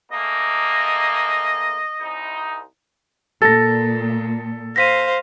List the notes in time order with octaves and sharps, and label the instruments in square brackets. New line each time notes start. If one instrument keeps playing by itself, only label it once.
[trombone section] G#2 A3 A#3 [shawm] D#5
[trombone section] C2 D#4
[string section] A#2 [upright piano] A4 [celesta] A6 A#6
[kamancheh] C5 F5 [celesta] A#6 B6 D#7